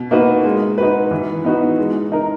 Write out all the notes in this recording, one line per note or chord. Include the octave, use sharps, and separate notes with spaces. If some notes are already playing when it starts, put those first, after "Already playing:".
Already playing: B2
A#3 D#4 F#4 B4
G#3
D#4 F#4 B4
E3
B3 D#4 F#4
G#3
D#4 A#4